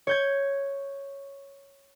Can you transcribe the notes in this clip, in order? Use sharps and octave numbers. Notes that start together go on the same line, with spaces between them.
C#5 G6 G#6